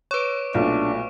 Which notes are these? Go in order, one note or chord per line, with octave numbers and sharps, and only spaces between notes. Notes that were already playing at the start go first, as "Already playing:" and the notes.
B4 C#5 C#6 D6 D7
B1 A#2 A3 D4